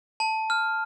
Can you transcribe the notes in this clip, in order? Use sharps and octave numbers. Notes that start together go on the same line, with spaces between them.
A5
F6